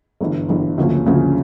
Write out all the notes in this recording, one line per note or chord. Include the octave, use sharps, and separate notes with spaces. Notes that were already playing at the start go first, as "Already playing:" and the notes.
G1 G2 E3
G1 G2 E3
D2 C#3 F3 A#3 C#4
D2 C#3 F3 A#3 C#4